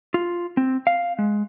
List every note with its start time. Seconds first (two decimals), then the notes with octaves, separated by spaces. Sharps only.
0.14 F4
0.57 C4
0.87 F5
1.19 G#3